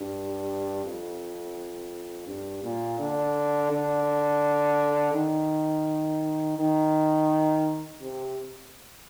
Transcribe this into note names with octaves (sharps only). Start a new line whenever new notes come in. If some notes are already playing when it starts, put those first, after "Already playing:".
Already playing: G2
F2
G2
A#2
D3
D3
D#3
D#3
C3